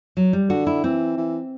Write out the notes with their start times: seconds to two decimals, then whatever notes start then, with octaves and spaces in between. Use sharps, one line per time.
0.17 F#3
0.33 G3
0.49 D3 F#4
0.67 E4
0.84 E3 C4
1.18 E3